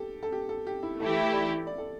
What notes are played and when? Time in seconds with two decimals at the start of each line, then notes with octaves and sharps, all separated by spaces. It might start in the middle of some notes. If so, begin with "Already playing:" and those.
Already playing: G4 A4
0.23 A4
0.32 G4
0.49 A4
0.67 G4
0.83 E4
1.00 E3 A3 E4 G4 A4
1.33 D5
1.67 D5
1.78 A4